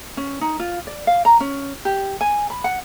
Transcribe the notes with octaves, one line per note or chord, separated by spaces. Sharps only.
C#4
D#4
F4
D5
F5
A#5
C#4
G4
G#5
B5
F#5